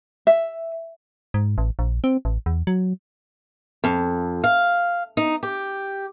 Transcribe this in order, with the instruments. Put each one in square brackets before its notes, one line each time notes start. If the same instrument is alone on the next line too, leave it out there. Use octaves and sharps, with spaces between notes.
[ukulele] E5
[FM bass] G#2
A1
A#1
C4
A1
E2
F#3
[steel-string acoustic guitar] F2
F5
D#4
G4